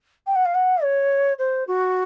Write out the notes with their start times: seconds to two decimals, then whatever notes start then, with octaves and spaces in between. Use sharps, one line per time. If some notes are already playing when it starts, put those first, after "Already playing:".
0.26 G5
0.35 F#5
0.45 F5
0.54 F#5
0.82 C#5
1.38 C5
1.67 F#4